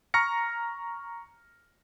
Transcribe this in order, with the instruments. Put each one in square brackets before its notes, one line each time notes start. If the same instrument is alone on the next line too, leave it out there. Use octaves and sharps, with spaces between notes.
[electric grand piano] A#5 C#6 F6 A#6 C#7